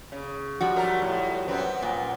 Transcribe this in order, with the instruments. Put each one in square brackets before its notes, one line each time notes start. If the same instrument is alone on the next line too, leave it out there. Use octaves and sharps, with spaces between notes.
[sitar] C#3
[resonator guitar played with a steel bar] F3 G3 F#4
[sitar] F#3 A3 A#4
A2
F#2 B3 C4
[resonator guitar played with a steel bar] A#2